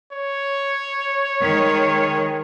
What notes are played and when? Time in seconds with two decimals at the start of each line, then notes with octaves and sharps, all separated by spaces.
0.13 C#5
1.42 D#3 G#3